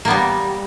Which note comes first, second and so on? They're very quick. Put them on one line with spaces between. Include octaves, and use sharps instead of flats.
A#3 B3 G3